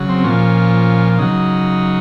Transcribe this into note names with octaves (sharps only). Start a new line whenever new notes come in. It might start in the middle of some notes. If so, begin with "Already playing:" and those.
Already playing: C#3 F#3
C4
A#2 F3 C#4
C#3 F#3 D#4